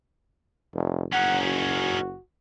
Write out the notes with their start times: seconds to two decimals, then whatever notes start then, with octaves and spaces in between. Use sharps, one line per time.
0.74 F1
1.13 F#1 C#4 D#4 F#5
1.46 F#4